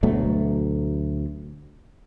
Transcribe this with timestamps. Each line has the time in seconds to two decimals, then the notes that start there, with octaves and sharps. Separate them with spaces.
0.03 D2 B2 F#3 A3